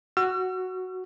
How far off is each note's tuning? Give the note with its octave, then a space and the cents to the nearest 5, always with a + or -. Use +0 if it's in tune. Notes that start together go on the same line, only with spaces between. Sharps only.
F#4 +0 E6 +45